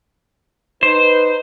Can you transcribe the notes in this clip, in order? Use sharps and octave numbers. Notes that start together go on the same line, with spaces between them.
D#4 B4 C5